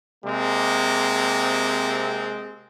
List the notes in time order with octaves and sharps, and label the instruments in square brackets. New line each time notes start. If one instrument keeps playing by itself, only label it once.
[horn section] C3 G#3 A#3 C4